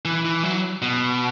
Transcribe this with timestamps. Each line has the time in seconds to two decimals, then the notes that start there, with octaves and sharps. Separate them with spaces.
0.05 E3
0.25 E3
0.43 F#3
0.82 B2